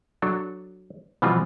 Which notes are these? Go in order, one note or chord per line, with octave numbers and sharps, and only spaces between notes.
F#3 D4 A4
B2 E3 F3 G3 C4 F4